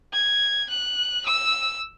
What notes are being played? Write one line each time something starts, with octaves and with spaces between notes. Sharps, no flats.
G#6
F#6
E6